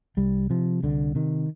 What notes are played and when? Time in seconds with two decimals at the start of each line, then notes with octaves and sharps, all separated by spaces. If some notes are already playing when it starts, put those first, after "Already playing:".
0.17 C2 G3
0.50 C3 F3
0.83 C2 D3
1.15 C3 D#3